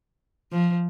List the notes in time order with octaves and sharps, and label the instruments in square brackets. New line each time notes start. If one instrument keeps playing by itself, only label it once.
[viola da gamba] F3